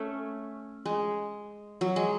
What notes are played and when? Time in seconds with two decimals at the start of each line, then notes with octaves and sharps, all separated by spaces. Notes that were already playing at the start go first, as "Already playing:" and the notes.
Already playing: A3 C#4
0.85 G#3
1.81 F#3
1.96 G#3